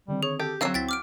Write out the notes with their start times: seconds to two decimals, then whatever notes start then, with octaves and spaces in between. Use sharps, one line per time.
0.08 D3 D#3 G3 C4
0.23 G#4 C#5
0.40 G4 A4
0.61 D3 D#3 F#3 C4 F5 E6 C7 E7
0.74 C#2 E4 G5 A6 B6
0.89 D6 F6 G6 D7